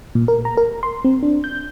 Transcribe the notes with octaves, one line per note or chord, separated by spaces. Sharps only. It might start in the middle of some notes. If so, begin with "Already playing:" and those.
A#2
A#4
A#5
A#4
C6
C4
D4
G6